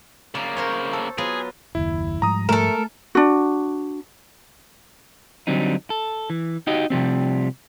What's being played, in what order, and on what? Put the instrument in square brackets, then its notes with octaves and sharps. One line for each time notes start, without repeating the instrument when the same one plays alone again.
[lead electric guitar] C#3 A#3 [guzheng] D5
[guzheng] A#4 C5 C#5
A4
[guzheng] F#3 B3 F4 [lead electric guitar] G#4
[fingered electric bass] F#1 D#2 [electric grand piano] E4
[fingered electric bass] G#2 F3 G3 [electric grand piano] A#5 D#6
[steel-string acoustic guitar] A3 [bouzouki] A4 A#4 [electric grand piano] E7
[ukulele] D4 F#4
[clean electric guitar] D3 F#3 G3 C4 D#4
A4
E3
D#4 F#4 G4 D#5
C3 F3 G3 C4